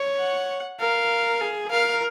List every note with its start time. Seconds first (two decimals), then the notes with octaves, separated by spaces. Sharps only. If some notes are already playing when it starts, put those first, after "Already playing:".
Already playing: C#5
0.20 F#5
0.80 A#4 F5
1.41 G#4
1.71 A#4 F5